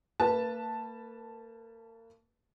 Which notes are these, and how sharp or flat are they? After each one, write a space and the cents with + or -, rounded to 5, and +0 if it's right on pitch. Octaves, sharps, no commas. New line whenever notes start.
A#3 -40 B4 -10 A5 +0